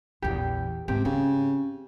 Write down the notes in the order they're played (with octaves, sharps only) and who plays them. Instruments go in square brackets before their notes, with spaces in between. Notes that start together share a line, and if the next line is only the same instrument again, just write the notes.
[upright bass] A#1 E2 [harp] G4
[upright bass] G#2 [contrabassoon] C3 [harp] G4
[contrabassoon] C#3 [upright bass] C4